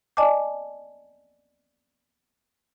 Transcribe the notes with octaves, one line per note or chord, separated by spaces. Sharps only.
D5 D#5 G#5 A5 D6